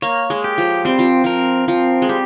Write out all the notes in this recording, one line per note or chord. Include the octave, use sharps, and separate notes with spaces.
A#3 C#5
G#3
G4
F3
G3 C4
F3
F3 A#4
F3 C4
G#3
G3 G4